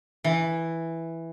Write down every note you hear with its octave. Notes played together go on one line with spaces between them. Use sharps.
E3